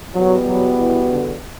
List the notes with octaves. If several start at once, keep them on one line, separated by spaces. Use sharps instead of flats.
E2 B2 F#3 G3 B3 F#4
F#3
E3
D3